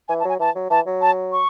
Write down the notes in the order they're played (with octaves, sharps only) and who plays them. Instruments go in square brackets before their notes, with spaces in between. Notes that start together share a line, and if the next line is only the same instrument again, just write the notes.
[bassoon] E3 [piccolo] G#5
[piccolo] A5
[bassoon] F#3 [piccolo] G#5
[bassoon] E3 [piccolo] A5
[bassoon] F#3
[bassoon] E3 [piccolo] A5
[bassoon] F#3
[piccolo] A5
C#6